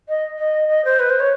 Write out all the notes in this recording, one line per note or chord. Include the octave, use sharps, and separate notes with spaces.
D#5
D#5
D#5
C5
B4
C5
C#5